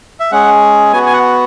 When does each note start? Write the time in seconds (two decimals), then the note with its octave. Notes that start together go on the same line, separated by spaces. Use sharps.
0.20 E5
0.31 G#3 C#4 G#4 F#5
0.92 B3 F#4 G#5
1.06 G#5
1.13 F#5